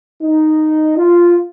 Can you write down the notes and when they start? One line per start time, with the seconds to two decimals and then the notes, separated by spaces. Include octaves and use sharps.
0.23 D#4
0.98 F4